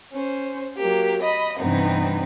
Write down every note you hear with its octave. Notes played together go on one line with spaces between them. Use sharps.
C#4 C5
F#3 A#3 G4
D#5 B5 D#6
G2 C3 E3 B3 C4 D#4